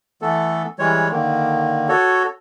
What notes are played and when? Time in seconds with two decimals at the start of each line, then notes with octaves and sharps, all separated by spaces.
0.22 E3 A3 B3 A4
0.79 E3 G3 G#3 C#5
1.11 D3 D#3 A#3
1.89 F#4 A4 C#5